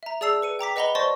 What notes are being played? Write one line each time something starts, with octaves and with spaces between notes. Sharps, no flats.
E5 A#5
G#4 D5 A5 E6 C7 F7
B4 C#7 D#7
G5 A#5 D6 B6
B4 D#5 F#5 A#5 B5 G7
C5 D5 A5 C6 C#6 A#6